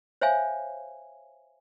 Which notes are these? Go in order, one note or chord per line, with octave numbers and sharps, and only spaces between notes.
C5 C#5 E5 F5 G#5